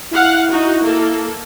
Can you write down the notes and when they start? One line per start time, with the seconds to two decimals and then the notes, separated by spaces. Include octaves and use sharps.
0.12 E4 F5 F#5
0.51 D#4 F#4
0.83 A#3 A4